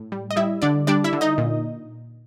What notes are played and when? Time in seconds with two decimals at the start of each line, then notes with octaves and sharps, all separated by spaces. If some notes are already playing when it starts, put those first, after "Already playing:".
Already playing: A2
0.12 G3
0.31 D#5
0.36 G3 E4 E5
0.62 D3 D4 D5
0.87 G3 D4 D5
1.04 E4 E5
1.13 D3
1.21 D#4 D#5
1.38 A#2